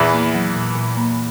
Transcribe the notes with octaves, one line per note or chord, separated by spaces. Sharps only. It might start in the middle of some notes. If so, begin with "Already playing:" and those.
Already playing: E2 A#2 E3
A#3
F#3
A#2
A#2
A#3